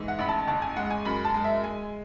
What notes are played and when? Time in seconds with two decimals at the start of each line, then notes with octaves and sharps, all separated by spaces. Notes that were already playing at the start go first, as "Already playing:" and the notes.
Already playing: G#2 E3
0.08 F#5
0.18 A1 B5
0.29 A5
0.47 F#1 A5
0.62 G#5
0.76 G#3 F#5
0.90 G#5
1.05 F#2 B5
1.25 A5
1.34 G#3
1.44 E5
1.64 G#3 G#5